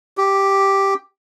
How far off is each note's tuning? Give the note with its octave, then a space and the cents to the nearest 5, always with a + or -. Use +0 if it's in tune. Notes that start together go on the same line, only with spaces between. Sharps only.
G4 +0